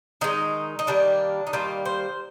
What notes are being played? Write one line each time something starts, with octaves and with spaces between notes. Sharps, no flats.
D#3 G#3 D#4
D#4
D#3 G3 A#3 D4
D#4
D#3 G3 A#3 F4
C5